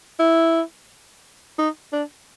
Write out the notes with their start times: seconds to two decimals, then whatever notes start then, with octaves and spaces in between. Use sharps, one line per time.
0.20 E4
1.59 D#4
1.93 D4